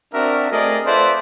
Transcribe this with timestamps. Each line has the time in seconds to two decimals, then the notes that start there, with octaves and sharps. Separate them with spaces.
0.13 C4 D4 F#4 A#4 D5 E5
0.52 A3 C4 G#4 A#4 D5 D#5
0.86 F4 A4 B4 C5 D5 E5